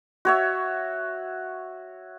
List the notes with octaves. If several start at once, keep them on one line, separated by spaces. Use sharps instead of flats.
F#4 C#5 E5